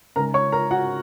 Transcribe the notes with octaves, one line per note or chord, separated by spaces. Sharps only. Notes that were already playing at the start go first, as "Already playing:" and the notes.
C#3 G#3 D#4 A#4 A#5
C#5 C#6
A#4 A#5
F#4 F#5